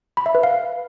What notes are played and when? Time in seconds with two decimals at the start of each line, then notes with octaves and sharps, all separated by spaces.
0.17 B5
0.26 E5
0.35 B4
0.43 F5